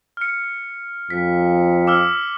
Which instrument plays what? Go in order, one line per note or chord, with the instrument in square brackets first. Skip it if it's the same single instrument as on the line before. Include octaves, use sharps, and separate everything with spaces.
[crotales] F6 C#7
[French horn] F2 [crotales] B6
[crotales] D6 E6 F6